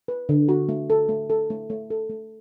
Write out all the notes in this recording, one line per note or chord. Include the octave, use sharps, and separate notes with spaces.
B4
D3
F#4
A3
A4
A3
A4
A3
A3
A4
A3